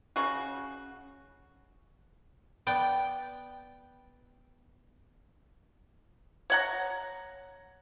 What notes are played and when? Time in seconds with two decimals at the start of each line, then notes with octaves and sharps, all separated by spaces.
0.16 C#3 F#4
2.67 B3 D5 G5
6.50 C#5 F#5 A#5